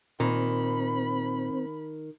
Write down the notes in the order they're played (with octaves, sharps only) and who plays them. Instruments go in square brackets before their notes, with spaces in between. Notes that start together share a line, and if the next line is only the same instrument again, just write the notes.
[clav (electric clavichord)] A#2 [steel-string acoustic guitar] D#3 [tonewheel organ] C4 [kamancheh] B5